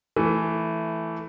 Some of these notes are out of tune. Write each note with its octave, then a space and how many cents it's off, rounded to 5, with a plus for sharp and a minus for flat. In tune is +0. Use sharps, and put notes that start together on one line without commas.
E3 +0 A3 +0